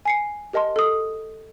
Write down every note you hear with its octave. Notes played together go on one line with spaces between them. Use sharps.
G#5 C7 C#7
G4 A#4 D#5 A5 C6
A4 D#6